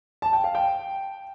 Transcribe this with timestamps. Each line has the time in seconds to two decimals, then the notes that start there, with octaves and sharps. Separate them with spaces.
0.22 A5
0.33 G5
0.44 F5
0.55 G5